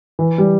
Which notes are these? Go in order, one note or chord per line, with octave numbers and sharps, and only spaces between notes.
E3
G3